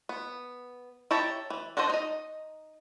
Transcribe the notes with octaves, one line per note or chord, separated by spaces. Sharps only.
B3
E4 G4 C#5 A5 A#5
E3
D4 F#4 A4 C5 D#5
D#4 D#5